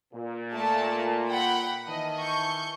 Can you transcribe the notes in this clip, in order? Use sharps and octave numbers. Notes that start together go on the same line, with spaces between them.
A#2
A3 A5
F#5 G5 B5
D#3 E3 D#5 A5
C#6 G6